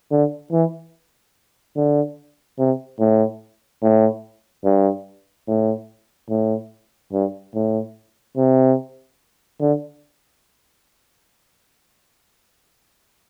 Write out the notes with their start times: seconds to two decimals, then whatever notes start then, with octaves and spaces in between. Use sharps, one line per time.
0.11 D3
0.52 E3
1.76 D3
2.59 C3
2.99 A2
3.82 A2
4.65 G2
5.48 A2
6.30 A2
7.12 G2
7.55 A2
8.37 C3
9.60 D3